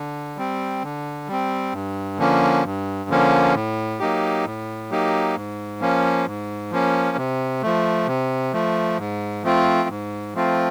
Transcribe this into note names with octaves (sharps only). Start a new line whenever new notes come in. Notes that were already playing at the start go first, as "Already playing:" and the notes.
Already playing: D3
G3 C4
D3
G3 C4
G2
D3 F3 A#3 C#4
G2
D3 F3 A#3 C#4
A2
F#3 A#3 D#4 G4
A2
F#3 A#3 D#4 G4
G#2
F3 A#3 C#4
G#2
F3 A#3 C#4
C3
F3 A3
C3
F3 A3
G#2
F3 A3 C4 F4
G#2
F3 A3 C4 F4